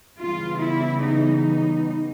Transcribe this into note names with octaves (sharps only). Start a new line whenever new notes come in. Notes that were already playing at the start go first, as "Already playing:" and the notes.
C#3 E3 G3 B3 F4
E4
D#4